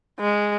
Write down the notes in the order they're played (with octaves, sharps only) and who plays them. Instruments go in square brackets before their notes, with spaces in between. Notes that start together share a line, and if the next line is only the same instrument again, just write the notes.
[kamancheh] G#3